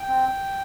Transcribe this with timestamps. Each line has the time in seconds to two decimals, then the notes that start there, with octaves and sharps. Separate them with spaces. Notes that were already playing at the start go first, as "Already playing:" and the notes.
Already playing: G5
0.09 C4